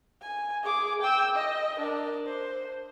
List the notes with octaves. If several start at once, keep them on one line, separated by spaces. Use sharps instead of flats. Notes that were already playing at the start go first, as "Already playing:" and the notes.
G#5
G#4 D6
G5 E6
D#5
D4 A#4
C5